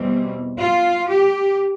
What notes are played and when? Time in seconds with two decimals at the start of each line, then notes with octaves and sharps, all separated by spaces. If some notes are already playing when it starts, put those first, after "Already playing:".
Already playing: E2 B2 G3 C4
0.60 F4
1.09 G4